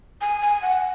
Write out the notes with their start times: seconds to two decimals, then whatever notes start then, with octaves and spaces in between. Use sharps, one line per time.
0.21 G#5
0.41 G#5
0.62 F#5